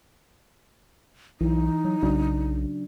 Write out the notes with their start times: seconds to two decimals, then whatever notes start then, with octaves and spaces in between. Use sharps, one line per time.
1.41 B1 E3 D#4
1.85 F#3
2.03 B1 C#3 F#3 D4